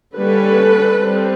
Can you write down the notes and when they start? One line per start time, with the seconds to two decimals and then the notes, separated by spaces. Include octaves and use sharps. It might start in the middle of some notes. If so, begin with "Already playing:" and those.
0.15 D3 G3 A#3 C#4 A4 B4
0.98 G3 C4